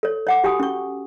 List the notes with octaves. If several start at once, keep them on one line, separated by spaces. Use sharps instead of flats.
A4 C#5
C#5 F#5 D6
F#4 G4 G5 G#5 D#6
C#4 C#6